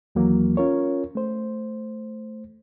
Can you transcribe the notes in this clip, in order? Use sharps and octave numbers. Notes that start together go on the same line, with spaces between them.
D#2 E3 F#3 A#3
C#4 F4 A#4 C#5
A3 C5